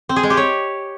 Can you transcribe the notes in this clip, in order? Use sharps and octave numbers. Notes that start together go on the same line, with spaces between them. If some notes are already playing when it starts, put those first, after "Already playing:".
C4
G#4
G#3
G4
C#5